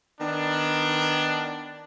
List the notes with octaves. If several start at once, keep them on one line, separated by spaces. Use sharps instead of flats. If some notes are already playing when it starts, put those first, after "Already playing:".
D#3 B3 D4